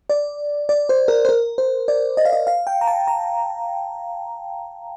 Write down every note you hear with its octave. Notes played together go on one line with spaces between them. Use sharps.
D5
D5
C5
A#4
C5
A#4
C5
D5
D#5
F5
D#5
F5
G5
A#5
A5
A#5